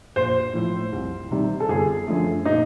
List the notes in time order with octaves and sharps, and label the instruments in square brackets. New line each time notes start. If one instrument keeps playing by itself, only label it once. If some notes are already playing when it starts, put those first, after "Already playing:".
[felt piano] A#1 [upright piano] C5
[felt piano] A2 F3
C2
C3 D#3 G3
[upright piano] A4
[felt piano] G1 [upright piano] G#4
[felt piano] F#2 D3 F3 A3
[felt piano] A#2 [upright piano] D#4